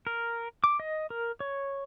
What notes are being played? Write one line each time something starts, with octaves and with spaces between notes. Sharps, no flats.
A#4
D6
D#5
A#4
C#5